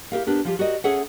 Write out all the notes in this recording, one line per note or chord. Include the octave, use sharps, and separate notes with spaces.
E4 G4 A#4 F5
B3 D4 G4 A#4
F3 F4 G4
F#4 G4 A#4 D5 D#5
C#4 G#4 A4 C#5 E5 F#5